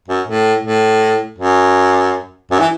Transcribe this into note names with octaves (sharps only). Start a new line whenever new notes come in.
F#2
A2
A2
F#2
F#2
E3